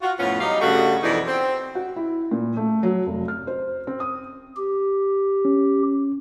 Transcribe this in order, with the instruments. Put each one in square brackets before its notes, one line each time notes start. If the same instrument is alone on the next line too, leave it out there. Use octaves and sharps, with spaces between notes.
[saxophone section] F4 F#4
F2 A2 B3 C#4 F4
F#3 G3 D#4 G4 D#5 F5
G2 C#3 G3 A3 F#4
F2 B2 E3 D#4 E4 D5
C4
[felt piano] F#4
E4
A#2
A3
F#3
F1
F6
C5
C4
D#6
[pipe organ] G4
[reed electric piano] C#4